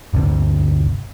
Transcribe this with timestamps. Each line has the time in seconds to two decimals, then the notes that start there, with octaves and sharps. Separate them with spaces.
0.13 G1 D2 C3